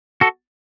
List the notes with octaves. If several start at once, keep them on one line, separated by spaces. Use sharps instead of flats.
F#4 A4